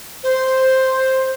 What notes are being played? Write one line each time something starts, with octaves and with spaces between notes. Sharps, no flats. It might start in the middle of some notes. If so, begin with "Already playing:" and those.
C5